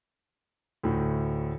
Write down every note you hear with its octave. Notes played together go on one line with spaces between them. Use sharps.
D2 A2